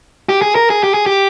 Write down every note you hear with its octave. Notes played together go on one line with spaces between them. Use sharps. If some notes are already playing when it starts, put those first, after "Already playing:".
G4
G#4
A#4
G#4
G4
G#4
G4